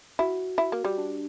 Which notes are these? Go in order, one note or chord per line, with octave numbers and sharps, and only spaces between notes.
E4 F#4
E4
A#3
G3
D4